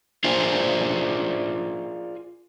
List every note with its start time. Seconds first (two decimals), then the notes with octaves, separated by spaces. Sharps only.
0.24 F4 G#4 A#4 C5 D5